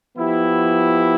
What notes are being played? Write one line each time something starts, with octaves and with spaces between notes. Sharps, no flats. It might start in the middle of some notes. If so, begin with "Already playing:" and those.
F3 B3 E4 G4